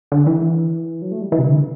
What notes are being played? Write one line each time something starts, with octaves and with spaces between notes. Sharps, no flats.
D3
E3
F#3
A3
G3
E3
C3
D3